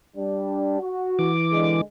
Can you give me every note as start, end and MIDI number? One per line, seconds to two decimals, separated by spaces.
0.16 0.78 55
0.16 0.78 62
0.80 1.27 66
1.19 1.81 52
1.19 1.81 86
1.52 1.80 50
1.52 1.80 56